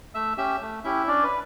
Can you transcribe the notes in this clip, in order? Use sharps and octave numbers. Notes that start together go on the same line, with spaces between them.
A3 E5 E6
C#4 G4 E5 E6
A3
C#4 E4 G4 E5
C#4 D4 D5
B4